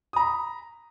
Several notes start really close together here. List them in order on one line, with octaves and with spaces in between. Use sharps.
D#6 A#5 B5